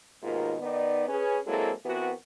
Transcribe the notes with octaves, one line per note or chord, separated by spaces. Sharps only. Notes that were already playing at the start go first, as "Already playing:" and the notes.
D#2 G#2 B2 D#3 F4 A#4
D#3 B3 D#4 D5
C#4 G#4 B4
F#3 G#3 A#3 C4 E4 A4
E3 B3 C4 F#4 A#4